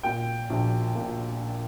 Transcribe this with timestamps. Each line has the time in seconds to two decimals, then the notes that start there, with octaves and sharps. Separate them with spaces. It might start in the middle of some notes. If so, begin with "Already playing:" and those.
0.03 A#2 G5
0.50 A#1
0.95 A#2